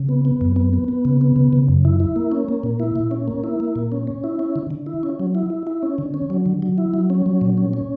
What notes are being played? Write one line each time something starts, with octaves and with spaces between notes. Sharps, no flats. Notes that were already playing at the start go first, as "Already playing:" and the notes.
Already playing: C#3
B3
B3
F#2
B3
B3
B3
C#3
B3
C#3
C#3
F#2
E4
E4
A#3
C#4
A#3
A#2
E4
A#2
C#4
A#3
E4
A#3
A#2
C#4
C#4
E4
C#4
D3
D3
E4
C#4
F#3
E4
E4
E4
C#4
D3
C#4
F#3
D3
F#3
E4
F#3
C#4
F#3
A#2
C#4
C#4